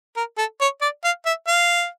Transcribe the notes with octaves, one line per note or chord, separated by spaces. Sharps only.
A#4
A4
C#5
D5
F5
E5
F5